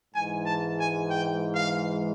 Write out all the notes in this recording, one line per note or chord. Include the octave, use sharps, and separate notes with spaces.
G#2 E3 G#3 G#5
A5
G#5
G5
F5